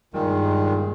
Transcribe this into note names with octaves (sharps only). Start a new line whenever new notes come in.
G2 A#2 D#3 G#3